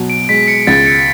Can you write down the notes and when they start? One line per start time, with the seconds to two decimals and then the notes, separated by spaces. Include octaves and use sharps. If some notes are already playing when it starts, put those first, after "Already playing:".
Already playing: B2 F#3
0.10 D7
0.29 G#3 B6
0.48 C#7
0.67 C#2 A6
0.86 C#7